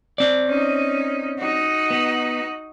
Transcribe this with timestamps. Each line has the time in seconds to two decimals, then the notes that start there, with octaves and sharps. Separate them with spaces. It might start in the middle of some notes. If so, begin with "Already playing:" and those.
0.18 C4 D5
0.47 C#4 D#4
1.39 D#4 F#4
1.91 B3